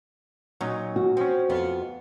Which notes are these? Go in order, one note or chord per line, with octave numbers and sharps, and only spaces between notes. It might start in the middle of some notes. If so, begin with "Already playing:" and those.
A#2 F#3 C#4 D#4
F#4
F3 C4 C#4
F2 B3 F4